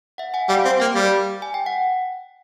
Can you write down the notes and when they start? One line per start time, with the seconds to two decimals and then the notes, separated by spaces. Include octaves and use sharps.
0.18 E5 F#5
0.34 F#5 G#5
0.49 G3 F5 G5
0.65 C4
0.80 A#3 F5 G5
0.95 G3
1.42 G#5
1.54 G5
1.66 F#5